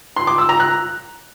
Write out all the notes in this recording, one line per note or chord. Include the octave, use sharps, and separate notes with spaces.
C6
D6
E6
A#5
F#6